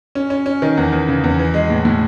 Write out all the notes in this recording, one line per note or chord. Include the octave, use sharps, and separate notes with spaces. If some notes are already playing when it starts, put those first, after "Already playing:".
C#4
C#4
C#4
D#3
E2
E2
C#3
E2
E3
G#3
A2
A2